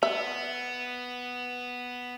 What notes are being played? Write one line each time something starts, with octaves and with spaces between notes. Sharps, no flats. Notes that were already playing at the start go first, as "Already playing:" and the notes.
B3 E5